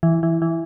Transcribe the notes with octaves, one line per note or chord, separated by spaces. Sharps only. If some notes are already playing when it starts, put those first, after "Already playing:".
E3
E3
E3